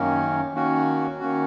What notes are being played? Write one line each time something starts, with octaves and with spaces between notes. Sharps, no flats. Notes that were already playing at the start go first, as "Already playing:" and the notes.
Already playing: F#2 D#3 A#3 C#4
D#3 A#3 C#4 F#4
D#3 A#3 C#4 F#4